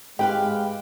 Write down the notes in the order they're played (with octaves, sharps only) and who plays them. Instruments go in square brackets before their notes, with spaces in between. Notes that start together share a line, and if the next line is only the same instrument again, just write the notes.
[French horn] G#3 [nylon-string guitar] G4 B4 F5 [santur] G5